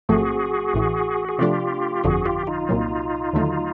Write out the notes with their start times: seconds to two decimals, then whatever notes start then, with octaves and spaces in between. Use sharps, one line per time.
0.09 A1 G#2 F3 A3 C4 F#4 G#4
0.74 A1 A2 E3
1.29 G#4
1.38 C3 F3 A3 D4 F4 G4
2.04 G1 F2 D3 F3 F#4 G#4
2.26 F4 G4
2.47 D#4 F4
2.69 C2 A#2 F#3
3.33 D#2 D3 F#3 A3